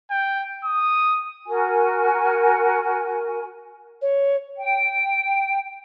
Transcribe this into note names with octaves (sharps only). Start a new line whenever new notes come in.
G5
D#6
F#4 A#4 G#5
C#5
G5